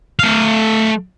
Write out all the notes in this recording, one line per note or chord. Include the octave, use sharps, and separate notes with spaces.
A3 F5